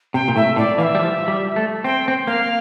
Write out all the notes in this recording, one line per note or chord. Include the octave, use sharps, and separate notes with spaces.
C3 G5
A#2
A2 E5
A2 D5
E3 F5
E5
G3
F3
G3
A3
C4 G5
C4
A#3 F5